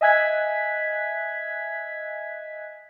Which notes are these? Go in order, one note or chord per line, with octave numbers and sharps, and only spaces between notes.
D#5 E5 G#5 F#6 G#6 B6